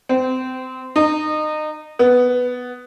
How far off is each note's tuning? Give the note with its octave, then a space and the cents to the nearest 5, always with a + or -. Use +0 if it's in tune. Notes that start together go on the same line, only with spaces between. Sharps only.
C4 -25
D#4 -25
B3 +5